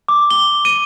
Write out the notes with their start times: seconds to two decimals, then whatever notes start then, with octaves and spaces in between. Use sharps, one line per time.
0.08 D6
0.31 G7
0.65 D#7